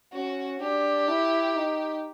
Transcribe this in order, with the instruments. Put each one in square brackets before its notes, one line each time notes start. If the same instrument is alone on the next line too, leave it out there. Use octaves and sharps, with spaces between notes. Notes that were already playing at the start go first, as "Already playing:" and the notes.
[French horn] C#4 [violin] F#4
[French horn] D4 [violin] G4
[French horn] E4
D#4